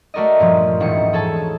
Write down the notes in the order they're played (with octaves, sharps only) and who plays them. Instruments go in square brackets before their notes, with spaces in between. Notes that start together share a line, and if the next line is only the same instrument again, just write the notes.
[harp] A3 F#4 A#4 D5 D#5
G2 A#2 F3
E1 A1 G#2 A3 D#6 C#7
G#4 A4 C#5 A5